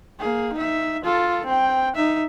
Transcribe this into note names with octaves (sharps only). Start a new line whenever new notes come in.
A#3 G#4
D#4 E5
F4 A4
C4 G5
D#4 E5